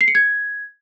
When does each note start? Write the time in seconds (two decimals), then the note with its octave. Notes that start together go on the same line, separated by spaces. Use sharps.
0.01 C7
0.08 C#7
0.15 G#6